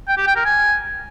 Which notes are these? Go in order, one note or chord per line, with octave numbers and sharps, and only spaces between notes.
G5
G4
G5
A#4
G#5